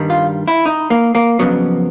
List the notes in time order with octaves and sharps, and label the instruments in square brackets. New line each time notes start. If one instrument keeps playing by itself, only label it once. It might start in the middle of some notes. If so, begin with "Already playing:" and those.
Already playing: [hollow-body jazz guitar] G2 D#3 G3
F4
E4
D#4
A#3
A#3
F2 C#3 F#3 B3